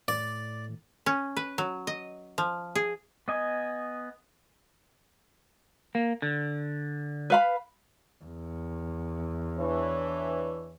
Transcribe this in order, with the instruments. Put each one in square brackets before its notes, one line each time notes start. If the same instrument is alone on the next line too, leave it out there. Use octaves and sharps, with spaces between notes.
[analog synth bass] A2 [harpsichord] D5
[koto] C#4
B4
F#3
D#5
F3
G#4
[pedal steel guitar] B3 D#5 G#5
[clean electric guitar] A#3
D3
[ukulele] B4 F5 B5
[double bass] E2
[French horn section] E3 D4 C#5